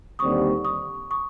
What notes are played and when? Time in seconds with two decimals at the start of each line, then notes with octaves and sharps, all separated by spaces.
0.19 D#2 D3 G3 C4 C#6 D#6
0.64 C#6 D#6
1.11 C#6 D#6